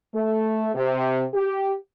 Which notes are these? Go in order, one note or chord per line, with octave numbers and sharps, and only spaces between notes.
A3
C3
G4